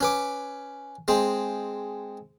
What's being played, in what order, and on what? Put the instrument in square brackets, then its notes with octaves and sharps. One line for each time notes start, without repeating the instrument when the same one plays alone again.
[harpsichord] C#4 B4 D6
G#3 C4